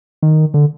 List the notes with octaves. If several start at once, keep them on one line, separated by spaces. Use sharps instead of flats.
D#3
D3